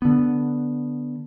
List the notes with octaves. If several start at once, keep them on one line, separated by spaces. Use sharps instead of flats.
D3 B3